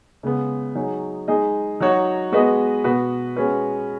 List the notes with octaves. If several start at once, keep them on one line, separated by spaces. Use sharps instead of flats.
C#3 G#3 B3
F#3 D#4 G#4 C#5
G#3 D#4 G#4 D#5
F#3 D#4 F#4 C#5
G#3 B3 F#4 B4 D#5
B2 B3 F#4 B4
G#3 C#4 F#4 B4